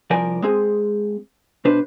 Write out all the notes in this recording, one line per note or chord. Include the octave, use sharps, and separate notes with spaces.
C2 F3 A#4 D5 G#5
G#3 C4 G#4
B2 D4 B4 C5